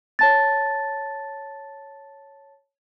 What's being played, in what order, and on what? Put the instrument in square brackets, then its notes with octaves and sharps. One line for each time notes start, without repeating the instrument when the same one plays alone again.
[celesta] C#5 A5 A6